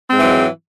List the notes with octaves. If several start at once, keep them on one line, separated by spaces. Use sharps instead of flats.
G#2 E3 F#3 G#3 C4